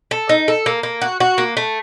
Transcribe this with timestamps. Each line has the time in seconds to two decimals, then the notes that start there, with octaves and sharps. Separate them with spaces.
0.11 A4
0.29 D#4
0.48 A4
0.66 A#3
0.83 A#3
1.02 F#4
1.20 F#4
1.38 A#3
1.57 A3